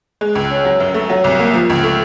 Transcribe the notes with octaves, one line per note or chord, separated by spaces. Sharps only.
G#3
C#2
C#4
F#3
F#2
A3
F#3
C2
A#3
F3
C#2
A3